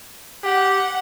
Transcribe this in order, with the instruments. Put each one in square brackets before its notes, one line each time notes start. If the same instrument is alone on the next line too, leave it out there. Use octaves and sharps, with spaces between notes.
[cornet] G4 [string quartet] F#5